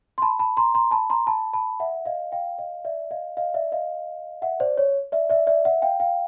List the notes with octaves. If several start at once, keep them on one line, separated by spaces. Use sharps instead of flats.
C6
A5 B5
A5 B5
A#5 C6
A#5 C6
A5 B5
A#5 C6
A5 B5
A5 B5
E5 F#5
D#5 F5
F5 G5
D#5 F5
D5 E5
D#5 F5
D#5 F5
D5 E5
D#5 F5
E5 F#5
C5 D5
C#5
D5 E5
D5 E5
D5 E5
E5 F#5
F5 G5
F5 G5